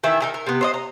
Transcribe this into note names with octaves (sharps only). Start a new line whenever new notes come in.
D#3 E3 E5
D#4 G#4 A#4
A#4
C3 B3
C5 C#5 D#5
A#5